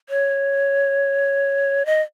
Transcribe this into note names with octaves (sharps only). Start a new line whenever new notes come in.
C#5
D#5